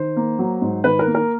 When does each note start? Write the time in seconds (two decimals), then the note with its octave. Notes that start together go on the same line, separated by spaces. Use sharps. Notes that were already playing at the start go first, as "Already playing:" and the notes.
Already playing: D#3 C5
0.16 A#3
0.39 F#3
0.62 G#2
0.84 D#3 B4
0.99 A#4
1.07 A#3
1.15 A#4